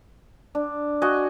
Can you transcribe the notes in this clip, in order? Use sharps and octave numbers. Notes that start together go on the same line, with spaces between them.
D4
F#4 D#5 G#5